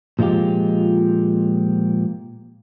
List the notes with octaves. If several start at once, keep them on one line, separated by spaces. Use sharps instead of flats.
A#2 F3 G#3 F4 G4